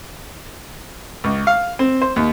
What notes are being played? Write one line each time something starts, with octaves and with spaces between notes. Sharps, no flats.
C#2
F5
C4
C5
D#2